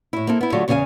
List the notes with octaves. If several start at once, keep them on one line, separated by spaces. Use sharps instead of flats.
A2 E4
A#3 C4 E4 A4
B3 E4
D3 F#3 A3 F4 G4 A4
E2 C#3 F4 F#4 F5 G#5